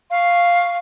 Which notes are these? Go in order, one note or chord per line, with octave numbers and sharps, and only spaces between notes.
F5 C#6